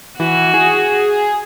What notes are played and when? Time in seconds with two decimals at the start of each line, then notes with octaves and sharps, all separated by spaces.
0.20 E3 F#4
0.54 G#4
0.99 G#4